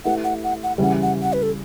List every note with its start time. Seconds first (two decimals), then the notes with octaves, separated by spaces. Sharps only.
0.05 A3 E4 G4 B4 F#5
0.24 F#5
0.44 F#5
0.63 F#5
0.78 C#3 E3 G3 F#5
1.02 F#5
1.22 F#5
1.33 B4
1.43 A4